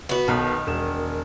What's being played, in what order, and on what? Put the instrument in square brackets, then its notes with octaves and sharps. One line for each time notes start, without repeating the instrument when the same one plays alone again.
[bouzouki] B3 F#4
[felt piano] B1 B2 [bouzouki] D#3
[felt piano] E1 E7